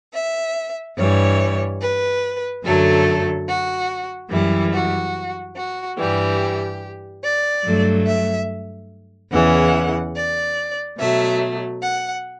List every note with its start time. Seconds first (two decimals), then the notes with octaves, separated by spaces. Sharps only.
0.12 E5
0.96 G2 E3 G3 C#5
1.80 B4
2.63 F#2 D3 F#3 A3 A4
3.46 F#4
4.30 F#2 E3 G3 E4
4.72 F#4
5.55 F#4
5.97 G2 E3 G3 G4
7.22 D5
7.64 G2 F#3 A3
8.05 E5
9.31 E2 C#3 E3 F#5
10.14 D5
10.97 B2 F#3 A3 E5
11.81 F#5